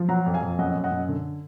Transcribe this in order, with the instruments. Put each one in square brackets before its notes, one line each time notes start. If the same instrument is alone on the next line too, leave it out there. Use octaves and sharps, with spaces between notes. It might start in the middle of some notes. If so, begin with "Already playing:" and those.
Already playing: [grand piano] F3
F#3 F#5 A#5
F2
F5 G#5
F2
F#2 D#5 F#5
F#2
D#5 F#5
F#2
D3